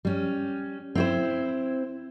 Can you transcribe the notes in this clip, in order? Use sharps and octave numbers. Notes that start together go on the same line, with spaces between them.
G3 C#4
C4 E4 C5